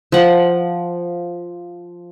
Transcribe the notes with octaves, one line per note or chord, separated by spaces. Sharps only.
F3 F#5